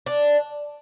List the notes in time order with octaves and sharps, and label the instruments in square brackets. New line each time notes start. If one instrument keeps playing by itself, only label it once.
[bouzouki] D4